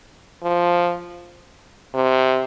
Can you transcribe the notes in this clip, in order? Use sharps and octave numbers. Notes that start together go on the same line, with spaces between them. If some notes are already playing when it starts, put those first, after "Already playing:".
F3
C3